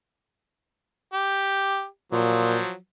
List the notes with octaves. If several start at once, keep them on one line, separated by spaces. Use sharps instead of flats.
G4
A#2 F3 F#3